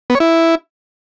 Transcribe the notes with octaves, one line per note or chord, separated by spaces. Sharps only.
B3
C#5
E4